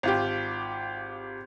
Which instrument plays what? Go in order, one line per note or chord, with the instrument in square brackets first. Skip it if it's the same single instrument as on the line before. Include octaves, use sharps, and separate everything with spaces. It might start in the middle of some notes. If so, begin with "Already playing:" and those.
[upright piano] G#1 F4 G4